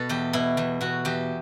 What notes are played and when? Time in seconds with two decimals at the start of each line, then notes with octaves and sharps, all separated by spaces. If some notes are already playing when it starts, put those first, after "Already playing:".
Already playing: B2 A4 B4
0.09 E2 G4
0.33 B2 E4
0.57 E2
0.81 B2 F#4
1.05 E2 G4